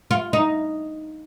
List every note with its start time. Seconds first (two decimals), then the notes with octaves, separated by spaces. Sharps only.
0.11 F4
0.33 D#4